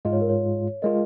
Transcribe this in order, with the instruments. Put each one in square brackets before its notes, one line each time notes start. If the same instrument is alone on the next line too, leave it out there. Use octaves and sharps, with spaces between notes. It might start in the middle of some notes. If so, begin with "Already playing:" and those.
[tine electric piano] G#2 G#3 F4 [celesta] D#5
[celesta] C#5
A#4
C#5
[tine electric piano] G#3 F4 [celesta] A#4 D#5